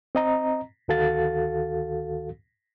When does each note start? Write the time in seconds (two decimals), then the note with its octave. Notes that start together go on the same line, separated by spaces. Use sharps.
0.15 C4 D#5 A#5
0.88 D2 D#3 F#4 A4 F5 A6